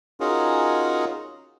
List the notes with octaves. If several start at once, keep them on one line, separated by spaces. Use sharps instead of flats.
C#4 D#4 F4 F#4 G#4 A#4